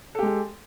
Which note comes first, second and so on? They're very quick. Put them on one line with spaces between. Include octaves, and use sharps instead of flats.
A4 G4 G#3